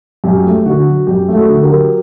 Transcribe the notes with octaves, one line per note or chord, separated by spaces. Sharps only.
F#2 G4
A3
D3 F#4
F#3
F#2 G4
A3
F#4 A4
D3
G4 A#4
F#3